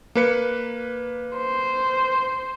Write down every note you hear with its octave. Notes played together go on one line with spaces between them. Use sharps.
A#3 B4 C#7
C5